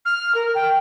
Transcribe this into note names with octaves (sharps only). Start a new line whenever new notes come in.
F6
A#4
G5